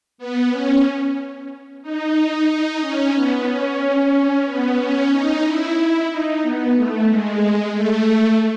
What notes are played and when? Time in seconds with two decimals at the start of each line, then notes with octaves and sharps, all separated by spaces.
0.18 B3
0.51 C#4
1.82 D#4
2.48 D#4
2.81 C#4
3.14 B3
3.47 C#4
4.45 B3
4.78 C#4
5.11 D#4
5.44 E4
5.77 E4
6.10 D#4
6.42 B3
6.75 A3
7.08 G#3
7.74 A3